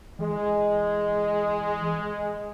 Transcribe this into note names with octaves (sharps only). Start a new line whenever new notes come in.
E3 G#3